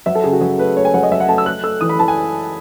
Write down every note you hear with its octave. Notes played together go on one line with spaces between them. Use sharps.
F#3 E5
A4
C#3 G#4
F#4
F#3 G#4
A3 B4
A3 C#5
G#5
F#3 F#5
D#5
F#3 E5
F#5
A3 A5
E6
A3 F#6
A3 E6
E3 D#6
B5
E3 A5
G#5